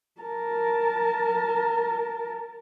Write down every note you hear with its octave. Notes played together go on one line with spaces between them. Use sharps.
A#4 A5